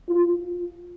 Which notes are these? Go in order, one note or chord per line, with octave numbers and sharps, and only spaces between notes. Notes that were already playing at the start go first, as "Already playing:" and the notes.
F4